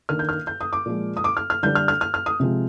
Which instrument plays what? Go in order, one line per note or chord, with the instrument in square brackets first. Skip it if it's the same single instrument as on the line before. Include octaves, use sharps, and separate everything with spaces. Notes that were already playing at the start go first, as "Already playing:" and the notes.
[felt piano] D#3 A#3 D4 F6
G6
F6
G6
D#6
D6
A#2 F3 G#3
D#6
D6
F6
F6
D3 G3 D4 G6
F6
F6
F6
F6
D#6
C3 F3 G#3